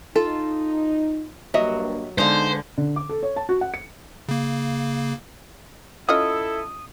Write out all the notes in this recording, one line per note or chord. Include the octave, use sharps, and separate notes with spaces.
D#4 F4 A4
G2 F#3 A#3 D#5 E5
D3 G#3 B3 D#4 C5 F5
D3
D6
A4
C#5
A5
F#4
F#5
C#7
C#3 A#3
C#4 E4 F4 A4 D#5 D#6